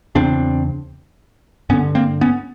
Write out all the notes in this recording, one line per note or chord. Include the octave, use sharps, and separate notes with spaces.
E2 C#3 C4 D4
G2 D3 B3 C#4
A#3 C4
B3 C#4